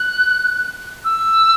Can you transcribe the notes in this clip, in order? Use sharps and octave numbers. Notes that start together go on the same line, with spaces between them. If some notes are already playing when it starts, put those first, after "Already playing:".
Already playing: F#6
E6